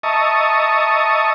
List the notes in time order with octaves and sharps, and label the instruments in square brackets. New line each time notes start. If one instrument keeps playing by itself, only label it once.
[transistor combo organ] D#5 E5 A5 A#5 C#6 D#6